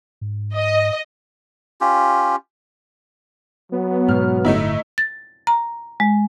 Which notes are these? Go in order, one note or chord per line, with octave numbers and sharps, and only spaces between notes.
G#2
D#5
C#4 F4 G4
F#3 B3
G#2 B2 F6
D1 G1 D2 A3 D#4 E4
A6
A#5
G#3